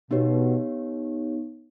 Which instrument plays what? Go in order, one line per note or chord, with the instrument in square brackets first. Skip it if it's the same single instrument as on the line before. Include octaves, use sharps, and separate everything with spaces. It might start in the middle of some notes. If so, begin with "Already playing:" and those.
[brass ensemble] B2 [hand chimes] B3 D#4 G4 C#5